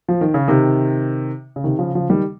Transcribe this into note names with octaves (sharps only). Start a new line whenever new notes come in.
F3
D#3
C#3
C3 D#3
C#3
C3 D#3
C#3 F3
C#3 F3
D#3 G3